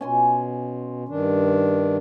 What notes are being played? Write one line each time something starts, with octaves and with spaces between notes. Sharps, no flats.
B2 C#4 G#5 C6
G2 D#3 D4